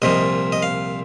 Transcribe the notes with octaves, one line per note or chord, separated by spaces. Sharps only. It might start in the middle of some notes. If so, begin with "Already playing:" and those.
C2 A#2 F3 D#5
D#5
F5